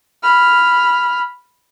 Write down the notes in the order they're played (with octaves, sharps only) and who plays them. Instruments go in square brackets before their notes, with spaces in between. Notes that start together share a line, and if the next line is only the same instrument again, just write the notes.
[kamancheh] B5 F6